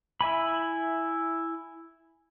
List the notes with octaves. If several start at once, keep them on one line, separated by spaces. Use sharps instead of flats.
E4 E5 G#5 B5